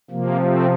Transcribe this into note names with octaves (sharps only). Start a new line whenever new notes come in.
C3 F3 A#3
A3 C4